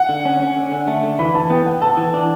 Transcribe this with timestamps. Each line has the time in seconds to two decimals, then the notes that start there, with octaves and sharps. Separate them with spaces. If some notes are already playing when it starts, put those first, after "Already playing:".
Already playing: F#5
0.09 D3
0.25 C#4
0.40 C#4
0.56 D3
0.72 D3
0.87 A3
1.03 D3
1.19 E3 B5
1.34 E3 A5
1.50 B3 G5
1.66 B3 F#5
1.81 A4 A5
1.97 E3
2.14 D4